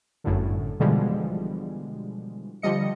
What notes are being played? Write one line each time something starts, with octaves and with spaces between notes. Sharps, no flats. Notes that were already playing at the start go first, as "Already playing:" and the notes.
G1 F#2 A2 D3
B2 D3 E3 F3 G3 G#3
D3 F3 G3 D#5 C#7